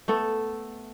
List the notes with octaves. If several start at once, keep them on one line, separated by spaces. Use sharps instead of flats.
A3 B3 A4